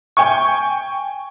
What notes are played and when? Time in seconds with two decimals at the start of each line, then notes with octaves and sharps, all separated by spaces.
0.17 G5 G#5 C#6